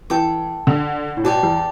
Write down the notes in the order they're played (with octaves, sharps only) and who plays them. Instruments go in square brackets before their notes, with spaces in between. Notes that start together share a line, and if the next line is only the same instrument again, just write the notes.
[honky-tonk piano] E3 [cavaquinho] A4 G5 D6
[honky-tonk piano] D3
A2
[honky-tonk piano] B2 [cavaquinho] G4 D5 A5
[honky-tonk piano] E2